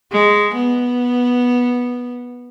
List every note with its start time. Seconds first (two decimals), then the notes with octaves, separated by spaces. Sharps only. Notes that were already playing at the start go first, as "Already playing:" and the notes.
0.12 G#3
0.55 B3